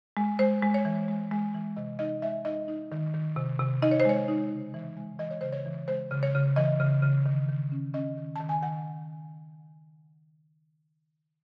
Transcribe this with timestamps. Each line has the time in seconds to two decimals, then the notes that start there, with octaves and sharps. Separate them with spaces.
0.17 G#3
0.39 G#3 C5
0.63 G#3
0.74 C#5
0.85 E3
1.08 G#3
1.32 G#3
1.54 E3
1.76 C3 D#5
1.99 D#4 D#5
2.22 G#3 E5
2.45 D#4 D#5
2.68 D#4
2.92 D#3
3.14 D#3
3.36 C3
3.60 C3
3.82 D#4 D#5
3.91 C#5
4.00 C5
4.05 G#3 C#5
4.28 D#4
4.51 C#3
4.74 E3
4.97 G#3
5.19 E3 D#5
5.31 C#5
5.41 C#3 C5
5.52 C#5
5.66 E3
5.88 G#3 C5
6.11 C#3
6.23 C#5
6.35 C#3
6.56 E3 D#5
6.80 C#3
7.03 C#3
7.26 D#3
7.49 D#3
7.72 C#4
7.94 C#4 D#5
8.18 D#3
8.36 D#3 A5
8.49 G#5
8.63 D#3 F#5